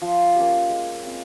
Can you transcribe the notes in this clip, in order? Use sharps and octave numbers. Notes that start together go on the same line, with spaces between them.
F3
A#3 C#4 G4
G#3
C4 F4